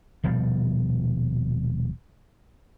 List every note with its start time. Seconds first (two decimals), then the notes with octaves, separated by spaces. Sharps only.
0.24 D#1 B2 F3 G3